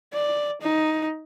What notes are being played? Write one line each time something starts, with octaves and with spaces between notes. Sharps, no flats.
D5
D#4